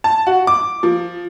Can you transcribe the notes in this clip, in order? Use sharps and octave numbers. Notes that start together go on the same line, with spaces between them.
A5
F#4
D6
F3